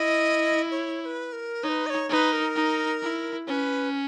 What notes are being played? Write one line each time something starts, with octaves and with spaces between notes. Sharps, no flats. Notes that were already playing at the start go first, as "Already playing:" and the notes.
Already playing: E4 D#5
C#5
C#5
B4
A#4
D#4 C#5
B4
D#5
C#5
D#4 B4 C#5
A#4
D#4
E4
C#4 B4 C#5